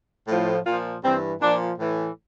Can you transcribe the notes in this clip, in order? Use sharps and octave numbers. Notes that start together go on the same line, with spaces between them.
A2 F3
A#2 F3 F4
G2 E3 C4
A#2 F3 D4
A2 E3